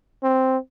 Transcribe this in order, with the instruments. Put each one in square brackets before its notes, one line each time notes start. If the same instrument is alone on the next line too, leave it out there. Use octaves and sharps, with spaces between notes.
[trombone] C4